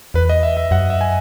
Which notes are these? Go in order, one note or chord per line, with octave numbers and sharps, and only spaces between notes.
E2 B4
D#5
E5
E5
F#2 F#5
E5
G#5